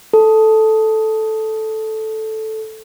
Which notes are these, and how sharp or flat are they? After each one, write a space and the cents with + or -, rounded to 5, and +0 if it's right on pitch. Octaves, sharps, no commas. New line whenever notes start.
A4 -5